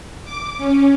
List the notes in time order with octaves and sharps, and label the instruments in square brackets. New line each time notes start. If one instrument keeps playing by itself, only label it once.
[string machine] D6
C#4